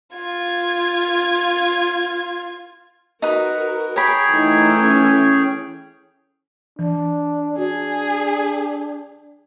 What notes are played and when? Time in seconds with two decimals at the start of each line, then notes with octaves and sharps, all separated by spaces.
0.16 F4 G#6
3.22 D#4 F#4 A#4 B4
3.96 G#4 A#4 C#5 G5 B5
4.31 E3 A3 D#4 E4
4.77 C#4
6.79 E3 D4
7.58 D4 F#4 G#4